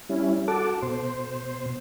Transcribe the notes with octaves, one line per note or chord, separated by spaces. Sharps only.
G3 C#4 E4
F#4 A4 F#5 A5 D6
B2 C5 C6